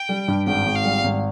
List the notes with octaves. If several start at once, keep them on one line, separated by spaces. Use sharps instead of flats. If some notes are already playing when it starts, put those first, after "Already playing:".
Already playing: G5
G3
G2
G#1 G5
G#1
F5
G3
G#1